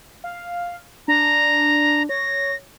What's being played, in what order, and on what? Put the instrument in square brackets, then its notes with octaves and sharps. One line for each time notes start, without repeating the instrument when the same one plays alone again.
[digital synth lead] F5
[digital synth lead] D4 [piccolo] A#5
[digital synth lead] C#5 [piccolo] A#6